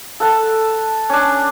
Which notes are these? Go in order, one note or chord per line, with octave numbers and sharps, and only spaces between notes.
A4 F#5 A5
C#4 D4